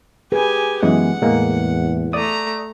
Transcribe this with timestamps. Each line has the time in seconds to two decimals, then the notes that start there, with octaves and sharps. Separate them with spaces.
0.32 G4 G#4 B4 G#5
0.83 F#2 E3 G#3 B3 F#5
1.22 E2 A2 G#3 A#3
2.13 A3 D5 A#5 D#6